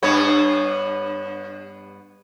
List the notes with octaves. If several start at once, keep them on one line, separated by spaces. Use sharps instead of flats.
G2 B3 C#5